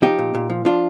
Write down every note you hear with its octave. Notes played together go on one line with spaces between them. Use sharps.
F3 D#4 G4
A#2
A#2
F3
F3 D4 F4